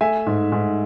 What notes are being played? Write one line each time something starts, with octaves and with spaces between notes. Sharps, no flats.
A3 E5 G#5
G#2
G#2